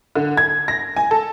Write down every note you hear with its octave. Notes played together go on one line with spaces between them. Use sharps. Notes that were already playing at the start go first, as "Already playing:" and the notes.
D3
G#6
A#6
G#5
A4